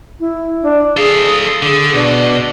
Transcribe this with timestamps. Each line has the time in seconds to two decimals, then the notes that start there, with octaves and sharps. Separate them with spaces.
0.19 E4
0.62 D4
0.97 G#4 A4 F5
1.62 D3 G#4
1.93 B2 D4